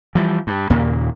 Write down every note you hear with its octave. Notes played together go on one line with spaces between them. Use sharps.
E3 F3 G3
G2
D#2 A#2 C#3 A#3